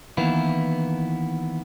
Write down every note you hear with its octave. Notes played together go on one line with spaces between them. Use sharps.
D#3 E3 A#3 B3 E4